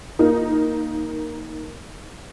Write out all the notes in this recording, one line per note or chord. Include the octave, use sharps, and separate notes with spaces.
A#3 D#4 A#4